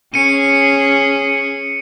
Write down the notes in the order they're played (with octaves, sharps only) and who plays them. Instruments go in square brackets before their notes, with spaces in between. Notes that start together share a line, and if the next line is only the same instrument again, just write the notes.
[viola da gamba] C#4 G#4 [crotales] C#7 D#7